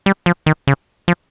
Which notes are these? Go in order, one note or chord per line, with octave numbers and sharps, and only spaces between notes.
G3
F3
D#3
C#3
F3